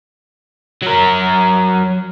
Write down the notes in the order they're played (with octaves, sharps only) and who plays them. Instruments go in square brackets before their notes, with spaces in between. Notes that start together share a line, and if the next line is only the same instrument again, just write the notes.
[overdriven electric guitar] F#3 A#4